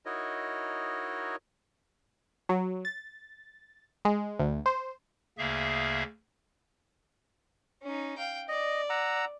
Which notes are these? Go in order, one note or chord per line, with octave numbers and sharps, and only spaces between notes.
D#4 E4 F#4 A#4 C#5 D#5
F#3
A6
G#3
D2
C5
D2 C#3 A#3 G#4 E5 F5
C#4 D#4
F5 G5
D5 D#5
F#5 A#5 E6